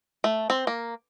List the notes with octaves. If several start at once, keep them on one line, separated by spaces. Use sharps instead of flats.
A3
C4
A#3